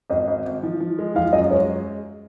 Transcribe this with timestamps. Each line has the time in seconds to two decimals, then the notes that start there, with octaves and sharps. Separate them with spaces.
0.10 G#1 D#5
0.27 G#1
0.46 G#1
0.63 F3
0.80 F3
0.99 G#3
1.15 F3 F5
1.33 F#2 D#5
1.50 G#3 C#5